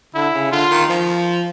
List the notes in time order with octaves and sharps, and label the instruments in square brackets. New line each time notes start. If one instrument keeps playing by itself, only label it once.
[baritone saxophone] D3 [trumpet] E4
[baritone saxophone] C#3
[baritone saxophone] D3 [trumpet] F4
[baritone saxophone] D#3
F3